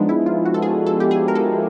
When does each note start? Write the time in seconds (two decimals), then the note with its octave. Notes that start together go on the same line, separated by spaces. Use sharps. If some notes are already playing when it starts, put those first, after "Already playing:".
Already playing: F3 G#3 B3 D4 D#4
0.09 E4
0.26 F4
0.45 F#4
0.54 A4
0.62 G#4
0.86 A4
1.00 G4
1.11 G#4
1.28 A#4
1.35 A4